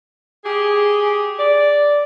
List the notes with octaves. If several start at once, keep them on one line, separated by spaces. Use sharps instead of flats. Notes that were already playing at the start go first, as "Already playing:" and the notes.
G4 G#4
D5